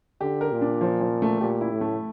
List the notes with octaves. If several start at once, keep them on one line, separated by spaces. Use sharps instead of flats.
D3 G4
A#4
A#2
D4
F3
F3
A3
A#2 G4
E4
A2
A3